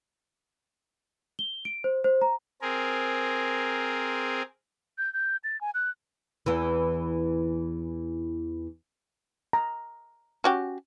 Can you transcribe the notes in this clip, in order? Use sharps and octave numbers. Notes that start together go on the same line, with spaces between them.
G7
D7
C5
C5
A#5
C4 G#4 A#4
G6
G6
A6
G#5
F#6
E2 E3
A#5
C#4 F#4 G4